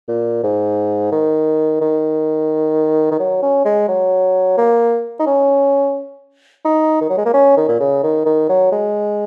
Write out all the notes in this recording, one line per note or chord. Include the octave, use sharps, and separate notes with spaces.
A#2
G#2
D#3
D#3
D#3
F#3
C#4
G#3
F#3
A#3
D#4
C#4
D#4
D#3
F#3
G#3
A#3
C#4
D#3
A#2
C#3
D#3
D#3
F#3
G#3